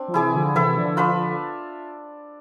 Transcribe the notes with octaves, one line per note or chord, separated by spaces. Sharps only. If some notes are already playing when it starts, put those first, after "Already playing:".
Already playing: C4 D4
F3
C3 E3 E4 G#4 D5
D3 F3
C3 E3 B3 E4 A4 E5
D3 F3
D4 F4 B4 E5